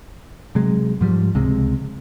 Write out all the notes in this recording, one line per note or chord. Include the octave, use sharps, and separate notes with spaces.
C3 F#3 G#3
G#2 F3 G3
C#2 C3 G#3